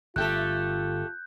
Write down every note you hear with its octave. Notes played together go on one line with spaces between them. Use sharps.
G1 A3 F4 G4 A4 F#6 G6